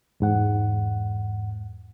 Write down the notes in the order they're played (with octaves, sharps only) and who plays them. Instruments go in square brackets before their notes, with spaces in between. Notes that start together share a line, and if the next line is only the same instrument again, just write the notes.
[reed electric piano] E2 G#2 F#5